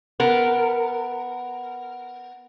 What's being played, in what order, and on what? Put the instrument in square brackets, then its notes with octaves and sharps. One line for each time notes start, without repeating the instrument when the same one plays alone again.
[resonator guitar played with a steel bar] B3 A#4